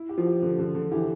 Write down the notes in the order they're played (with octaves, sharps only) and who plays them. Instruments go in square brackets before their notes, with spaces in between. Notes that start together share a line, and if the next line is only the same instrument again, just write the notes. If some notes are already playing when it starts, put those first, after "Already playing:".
Already playing: [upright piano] E4
G4
[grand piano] F3
[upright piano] G4
D3
D3
D3
[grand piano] E3 [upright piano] G4